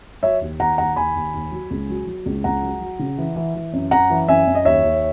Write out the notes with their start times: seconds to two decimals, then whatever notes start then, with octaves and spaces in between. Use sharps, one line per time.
0.23 F#3 C#5 E5
0.41 D#2
0.60 D#2 F#5 A#5
0.78 D#2 F#5 A#5
0.96 D#2 G#5 B5
1.15 D#2
1.34 D#2
1.51 F#3
1.70 C#2
1.89 F#3
2.07 F#3
2.26 C#2
2.44 C#2 F#5 A#5
2.63 F#3
2.81 F#3
2.99 C#3
3.18 E3
3.36 E3
3.55 E3
3.73 F#2
3.91 F#2 F#5 A#5
4.10 E3
4.28 F#2 E5 G#5
4.47 F#2
4.55 D#5
4.65 D#2 C#5 E5
4.84 D#2